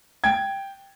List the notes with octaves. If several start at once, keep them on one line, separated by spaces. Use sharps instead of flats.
G5 G#6